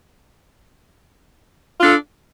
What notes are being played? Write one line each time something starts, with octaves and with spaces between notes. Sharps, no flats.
D4 F4 A4